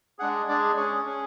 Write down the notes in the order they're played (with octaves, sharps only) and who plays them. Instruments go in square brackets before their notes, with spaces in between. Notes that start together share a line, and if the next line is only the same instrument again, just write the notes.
[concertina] G#3 D4 G#4 F#5
G#3 D4 G#4 D5
C#4 G#4 C#5
C#4 G#4